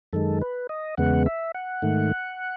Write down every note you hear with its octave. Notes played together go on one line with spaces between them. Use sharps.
F#2 D#3 G#3 A4
B4
D#5
E2 C#3 G#3 B3 F#5
E5
F#5
G#2 D#3 A3